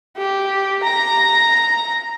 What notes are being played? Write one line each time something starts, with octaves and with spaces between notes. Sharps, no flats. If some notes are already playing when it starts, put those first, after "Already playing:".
G4
A#5